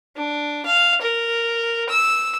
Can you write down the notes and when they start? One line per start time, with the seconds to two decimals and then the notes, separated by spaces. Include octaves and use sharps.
0.16 D4
0.65 F5
1.01 A#4
1.89 E6